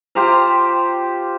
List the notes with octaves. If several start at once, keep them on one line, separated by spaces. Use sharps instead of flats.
F4 G4 C5 A#5